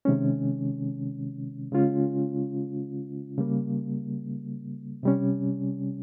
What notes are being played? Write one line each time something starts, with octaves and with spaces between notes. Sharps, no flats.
C3 D#3 G#3 C#4
C#3 G#3 C#4 F4
C#3 G3 A#3
C3 G3 C#4